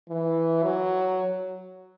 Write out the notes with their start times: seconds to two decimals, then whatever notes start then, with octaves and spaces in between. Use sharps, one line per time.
0.09 E3
0.63 F#3